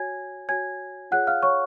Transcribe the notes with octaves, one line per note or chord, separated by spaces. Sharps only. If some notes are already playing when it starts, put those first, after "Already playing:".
Already playing: F#4 C#5 G#5 G#6
F#4 C#5 G#5 G#6
F4 G#4 C#5 F#5 F#6
F5 F6
C#5 C#6